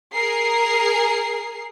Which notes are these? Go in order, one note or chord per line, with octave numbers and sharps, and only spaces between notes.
G#4 A#4 C7